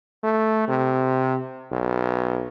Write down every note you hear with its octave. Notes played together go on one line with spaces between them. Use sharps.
A3
C3
B1